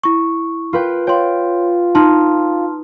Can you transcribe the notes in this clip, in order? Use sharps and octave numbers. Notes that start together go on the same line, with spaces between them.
E4 C#6
F4 B4 G5
F4 C#5 G5 C6
D#4 A5 C6 F6